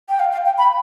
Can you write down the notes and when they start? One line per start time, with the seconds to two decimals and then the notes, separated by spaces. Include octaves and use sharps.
0.09 G5
0.20 F5
0.32 F5
0.45 G5
0.58 B5